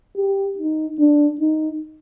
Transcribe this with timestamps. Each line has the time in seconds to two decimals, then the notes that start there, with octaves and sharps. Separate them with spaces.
0.17 G4
0.58 D#4
0.99 D4
1.41 D#4